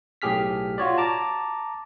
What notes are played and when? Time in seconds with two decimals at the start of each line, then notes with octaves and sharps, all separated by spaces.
0.22 B1 A2 G4 G#4 F6 B6
0.78 F4 F#4 C#5 D5
0.98 A5 A#5 D6